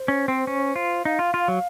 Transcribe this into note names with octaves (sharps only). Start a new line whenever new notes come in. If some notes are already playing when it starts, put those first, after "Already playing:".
Already playing: C5
C#4
C4
C#4
F4
D#4 F5
F4
F4
F#3